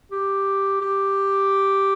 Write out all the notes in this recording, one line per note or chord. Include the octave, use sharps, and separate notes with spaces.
G4
G4